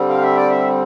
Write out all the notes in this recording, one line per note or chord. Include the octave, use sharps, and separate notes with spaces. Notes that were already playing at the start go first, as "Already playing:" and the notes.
Already playing: D3 G3 C4
F5
E5
D5
E5